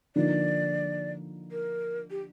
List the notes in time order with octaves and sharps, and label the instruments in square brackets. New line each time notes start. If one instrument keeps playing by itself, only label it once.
[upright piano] D3 F3 A#3 D#4 [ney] D5
[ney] A#4
G4